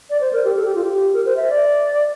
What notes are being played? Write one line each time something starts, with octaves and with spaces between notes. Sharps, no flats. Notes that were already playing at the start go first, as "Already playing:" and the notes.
D5
C5
A#4
G4
A4
G4
F4
G4
A#4
C5
E5
D5